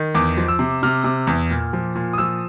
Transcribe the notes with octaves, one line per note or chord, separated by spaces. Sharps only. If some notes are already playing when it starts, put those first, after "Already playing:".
Already playing: D#3
E2 D6
F3
E6
C3
C3 F6
C3
E2
A#2
F3
A#2
D#6
F3 E6